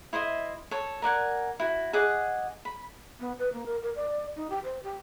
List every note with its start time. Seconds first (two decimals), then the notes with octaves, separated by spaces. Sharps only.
0.13 E4 C5 D#5 E5
0.71 A4 C#5
1.02 A#4 D5 F#5 G#5
1.60 E4 F#4
1.93 G#4 D#5 F#5 D6
2.65 B5
3.20 B3
3.39 B4
3.53 A#3
3.66 A#4
3.83 A#4
3.96 D5
4.36 D#4
4.50 G4
4.64 C5
4.83 G4